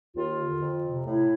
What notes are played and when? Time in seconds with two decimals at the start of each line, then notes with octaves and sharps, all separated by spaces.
0.16 D#2 F4
0.38 D3
0.61 F2
0.84 C3
1.06 A2 E4